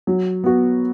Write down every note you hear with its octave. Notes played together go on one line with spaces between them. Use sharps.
F#3
B3 F#4